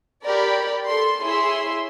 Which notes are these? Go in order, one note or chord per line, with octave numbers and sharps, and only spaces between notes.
G4 A#4 C#5 D5 B5
A4 C6
E4 G#4 C#5 E5 C6